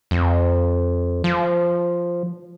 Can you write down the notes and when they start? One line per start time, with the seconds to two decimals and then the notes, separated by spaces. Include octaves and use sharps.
0.11 F2
1.24 F3